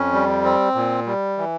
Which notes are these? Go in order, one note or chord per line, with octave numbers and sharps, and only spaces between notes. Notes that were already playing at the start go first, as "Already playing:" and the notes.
Already playing: F2 C#4
G3
C4
A#2
G3
E3